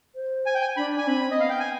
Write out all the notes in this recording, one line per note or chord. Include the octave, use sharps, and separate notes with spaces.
C5
G#5
G5
G#5
D4 B5
D4 G#5
C4 B5
D#5
B3 F5
G5
G#5